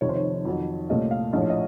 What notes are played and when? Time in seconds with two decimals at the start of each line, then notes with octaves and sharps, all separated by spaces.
0.01 F1 F2 D#3 C#5
0.09 C5
0.16 C#5
0.45 F2 D#3 F#3
0.89 C2 A#2 A3 C#4 D#5
1.11 F5
1.33 A#1 A2 F3 A3 C#4 D#5
1.42 C#5
1.50 D#5